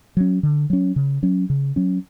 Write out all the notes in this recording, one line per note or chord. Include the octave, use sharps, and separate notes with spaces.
F#3 C#4
D3
F#3 C#4
C#3
F#3 C#4
C#3
F#3 C#4